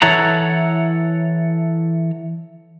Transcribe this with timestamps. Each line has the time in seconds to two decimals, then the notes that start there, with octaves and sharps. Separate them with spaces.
0.02 E3 E4 A4 C#5 F#5 A#5